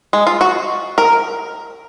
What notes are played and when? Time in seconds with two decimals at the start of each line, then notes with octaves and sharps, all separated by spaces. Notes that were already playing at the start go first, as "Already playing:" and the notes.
0.13 G#3
0.27 F4
0.41 F#4
0.98 A#4